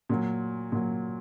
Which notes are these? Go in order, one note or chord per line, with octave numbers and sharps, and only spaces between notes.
A#2 F#3
A#2 F#3